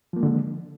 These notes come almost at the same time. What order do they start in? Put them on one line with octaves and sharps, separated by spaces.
F3 A#3 G#3 D3